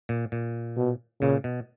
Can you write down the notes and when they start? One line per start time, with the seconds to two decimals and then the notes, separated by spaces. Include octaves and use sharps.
0.09 A#2
0.32 A#2
0.76 B2
1.21 A#2 C#3
1.44 B2